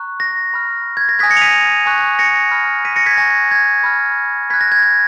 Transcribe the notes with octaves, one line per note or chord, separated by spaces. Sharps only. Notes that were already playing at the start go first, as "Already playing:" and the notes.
Already playing: A#5 C#6 F#6
A#6
B5 F6
G#6
A#6
G#5 D#6 F#6 G#6 B6
A#6 C#7
F7
B6 D#7
G#5 C#6 F#6
A#6 C#7
B5 F6
B6 D#7
A#6 C#7
G#6 B6
G#5 C#6 F#6 A#6
G#6
B5 F6
B5 F#6 G#6 B6
A#6
G#6
G#6